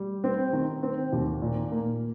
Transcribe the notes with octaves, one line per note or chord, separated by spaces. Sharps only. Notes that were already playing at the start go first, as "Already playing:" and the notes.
Already playing: G3
C4
D#3
C4
D#2
A#2
A#3